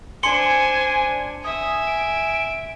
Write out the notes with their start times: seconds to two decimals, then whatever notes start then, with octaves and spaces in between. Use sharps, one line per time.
0.23 D4 C5 G#5 C6 C#7 G7
1.44 E5 G#5 D#6
1.87 D7